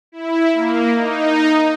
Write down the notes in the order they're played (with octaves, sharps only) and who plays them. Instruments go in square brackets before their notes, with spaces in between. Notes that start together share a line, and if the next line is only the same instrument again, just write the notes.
[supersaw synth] E4
A#3
D#4